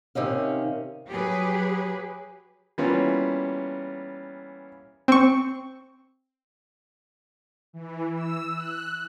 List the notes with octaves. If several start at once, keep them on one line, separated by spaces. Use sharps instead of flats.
C3 D#3 C#4 F5
F#3 G4 G#4 B4
E3 G3 A#3 B3 C#4 F4
C4 C#6
E3
E6
F#6